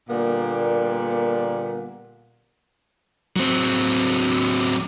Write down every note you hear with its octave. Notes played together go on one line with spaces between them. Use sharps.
A#2 D3 G3 A#3 B3
F#3 C4